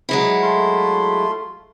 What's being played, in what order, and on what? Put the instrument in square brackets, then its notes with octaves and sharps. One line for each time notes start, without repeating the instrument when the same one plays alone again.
[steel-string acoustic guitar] F#3 G#3 E4
[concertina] A3 F4 C6